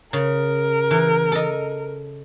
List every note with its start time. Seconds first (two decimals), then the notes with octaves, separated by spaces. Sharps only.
0.13 C#3 A#4
0.91 E3
1.32 A4 D#5